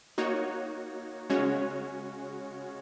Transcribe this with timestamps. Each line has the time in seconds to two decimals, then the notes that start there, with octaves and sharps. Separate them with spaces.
0.18 A#3 D#4 F#4 C#5
1.30 C#3 G#3 C#4 F#4 C#5